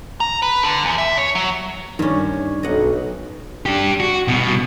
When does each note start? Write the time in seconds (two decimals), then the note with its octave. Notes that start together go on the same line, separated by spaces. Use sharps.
0.20 A#5
0.42 B4
0.63 D3
0.85 E2
0.98 E5
1.18 C#5
1.35 F#3
1.99 G2 D#3 C#4
2.63 B1 D#5 F#5
3.66 D4 G4
4.00 F#4
4.28 C2 B2